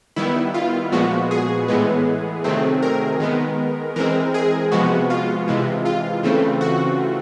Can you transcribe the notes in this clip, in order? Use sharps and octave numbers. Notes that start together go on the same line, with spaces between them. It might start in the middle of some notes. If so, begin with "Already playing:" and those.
D#3 G3 B3 E4
F4
A#2 F3 G#3 B3 F#4
G#4
A2 E3 G#3 B3
C3 D#3 F#3 A3 C4
A#4
D#3 G#3 B3
E3 G#3 C4 A#4
G#4
C3 F3 G#3 B3 F#4
F4
C3 E3 G#3
F4
C#3 E3 A3 C4
F#4